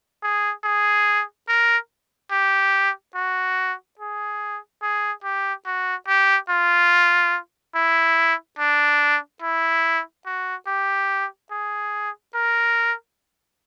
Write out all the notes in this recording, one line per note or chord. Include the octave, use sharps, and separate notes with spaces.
G#4
G#4
A#4
G4
F#4
G#4
G#4
G4
F#4
G4
F4
E4
D4
E4
F#4
G4
G#4
A#4